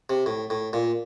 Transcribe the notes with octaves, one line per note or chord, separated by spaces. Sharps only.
C3
A2
A2
A#2